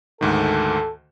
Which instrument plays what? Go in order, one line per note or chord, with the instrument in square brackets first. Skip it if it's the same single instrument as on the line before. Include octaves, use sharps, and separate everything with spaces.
[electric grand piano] D2 G#2 D#3 [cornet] A4